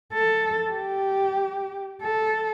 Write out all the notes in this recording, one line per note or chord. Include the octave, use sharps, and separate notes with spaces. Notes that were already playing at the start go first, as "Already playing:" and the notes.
A4
G4
A4